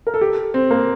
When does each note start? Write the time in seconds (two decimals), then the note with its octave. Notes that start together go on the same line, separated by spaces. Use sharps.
0.07 A#4
0.14 A4
0.21 G4
0.54 C4
0.71 A#3